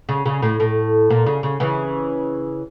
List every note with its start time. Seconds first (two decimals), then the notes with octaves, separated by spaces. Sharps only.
0.09 C#3
0.26 C#3
0.42 A2
0.60 A2
1.10 A#2
1.26 C#3
1.43 C#3
1.60 C#3 E3